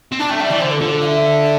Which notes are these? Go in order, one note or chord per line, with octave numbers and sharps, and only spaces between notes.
C4
D4 A5
A3 G5
G3 E5
E3 D5
D3 C5
A4
D3 F4
F5
E5